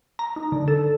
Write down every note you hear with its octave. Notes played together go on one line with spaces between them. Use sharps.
A#5
D#4
D3
A4